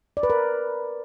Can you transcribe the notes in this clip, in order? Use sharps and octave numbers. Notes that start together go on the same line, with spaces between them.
D5
B4
A#4